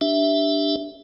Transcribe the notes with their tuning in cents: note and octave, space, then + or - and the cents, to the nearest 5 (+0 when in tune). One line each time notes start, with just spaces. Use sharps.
D4 +0 G4 +0 E5 +0